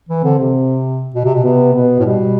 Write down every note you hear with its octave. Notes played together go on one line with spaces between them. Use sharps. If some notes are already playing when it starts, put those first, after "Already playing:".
E3
D3 C4
C3
B2
C3
B2
C3 B3
B2 B3
A2
B2 G3